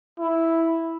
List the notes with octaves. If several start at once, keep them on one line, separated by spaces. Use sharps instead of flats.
E4